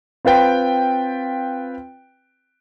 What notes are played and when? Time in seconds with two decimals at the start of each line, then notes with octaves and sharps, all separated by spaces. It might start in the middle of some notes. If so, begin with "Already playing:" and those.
0.25 C4 F4 B4 G5